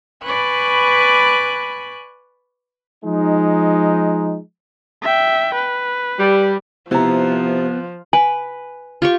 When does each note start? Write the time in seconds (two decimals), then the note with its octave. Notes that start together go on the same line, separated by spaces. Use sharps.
0.24 B4 D5 G#5 B5 C#6 F#6
3.05 F3 G#3 D#4
5.02 E5 G5
5.55 B4
6.19 G3
6.91 C3 F3 B3 E4 A#5
8.13 B4 G#5
9.02 F4 G4 C#6